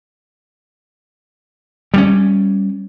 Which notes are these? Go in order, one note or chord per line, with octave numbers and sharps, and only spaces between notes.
G3 B3 C#4